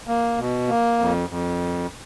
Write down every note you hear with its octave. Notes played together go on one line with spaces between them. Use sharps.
A#3
B2
A#3
F2
F2